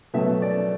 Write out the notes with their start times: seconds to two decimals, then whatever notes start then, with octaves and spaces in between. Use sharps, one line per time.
0.14 B2 F#3 A3 E5
0.42 D5